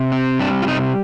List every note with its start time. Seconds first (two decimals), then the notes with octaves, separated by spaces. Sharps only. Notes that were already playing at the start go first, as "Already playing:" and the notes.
Already playing: C3
0.12 C4
0.39 G3 D4
0.62 F4
0.68 C3 D#4